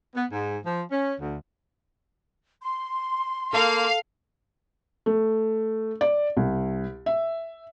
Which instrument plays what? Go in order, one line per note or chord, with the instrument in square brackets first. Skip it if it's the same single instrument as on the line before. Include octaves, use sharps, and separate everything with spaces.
[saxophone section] B3
G#2
F3
C#4
D2
[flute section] C6
[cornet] A#3 [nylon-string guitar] A4 [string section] F5
[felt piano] A3
D5
C2
E5